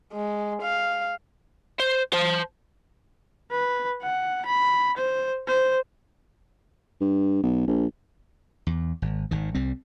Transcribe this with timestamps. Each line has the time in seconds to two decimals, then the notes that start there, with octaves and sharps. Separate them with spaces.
0.13 G#3
0.63 F5
1.80 C5
2.13 C5 A5
3.51 B4
4.02 F#5
4.46 B5
4.97 C5
5.48 C5
7.01 G2
7.43 B1
7.67 A#1
8.67 E2
9.02 G#1
9.31 G#1 D#3
9.55 C2 G3 C4